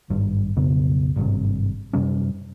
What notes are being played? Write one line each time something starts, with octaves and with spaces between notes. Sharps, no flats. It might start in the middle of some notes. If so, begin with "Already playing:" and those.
G#1 G2
B1 F2 C#3 B3
G#1 G2 C3
F#2 C3 G3 C#4